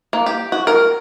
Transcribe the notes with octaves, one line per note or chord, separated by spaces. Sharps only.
A#3
G4
F#4
A#4